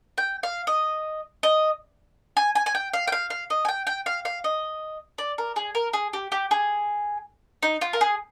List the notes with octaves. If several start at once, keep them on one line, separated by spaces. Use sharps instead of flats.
G5
F5
D#5
D#5
G#5
G#5
G#5
G5
F5
G5
F5
F5
D#5
G#5
G5
G5
F5
F5
D#5
D5
A#4
G#4
A#4
G#4
G4
G4
G#4
D#4
F4
A#4
G#4